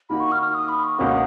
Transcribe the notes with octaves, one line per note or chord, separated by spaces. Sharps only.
D#3 A#3 D#4 F#4 B5
C#6
F6
F6
D#6
B5
C#6
C#2 B2 A#3 C#4 F#4 D#6